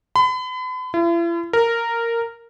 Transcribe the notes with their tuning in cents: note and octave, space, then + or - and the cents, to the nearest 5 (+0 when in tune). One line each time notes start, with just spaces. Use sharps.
B5 +40
E4 +45
A#4 -10